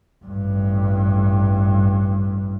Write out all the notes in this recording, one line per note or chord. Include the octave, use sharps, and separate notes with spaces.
A1 G2